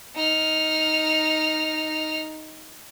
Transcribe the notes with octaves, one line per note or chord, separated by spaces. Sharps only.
D#4 F6